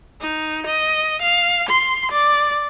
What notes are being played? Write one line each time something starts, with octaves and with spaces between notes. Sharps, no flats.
D#4
D#5
F5
C6
D5